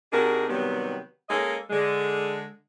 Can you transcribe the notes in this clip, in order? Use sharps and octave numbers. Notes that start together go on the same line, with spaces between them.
C3 D4 D#4 F#4 G#4 A#4
C3 D#3 F#3 G3 B3
G#3 A#3 C#4 A4 D#5
D3 G#3